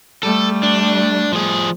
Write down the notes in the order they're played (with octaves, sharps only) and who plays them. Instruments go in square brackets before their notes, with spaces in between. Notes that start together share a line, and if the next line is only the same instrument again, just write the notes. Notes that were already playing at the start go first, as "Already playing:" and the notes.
[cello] G3 A3 [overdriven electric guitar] A4
[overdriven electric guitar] D4
F3 G#4